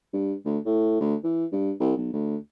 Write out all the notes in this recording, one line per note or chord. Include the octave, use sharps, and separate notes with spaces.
G2
D2
A2
D2
E3
G2
C2
B1
D2